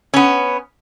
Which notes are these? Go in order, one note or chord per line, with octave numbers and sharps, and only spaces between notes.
B3 C#4